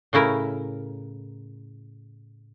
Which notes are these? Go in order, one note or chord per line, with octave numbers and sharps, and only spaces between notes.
A2 C#3 E4 A#4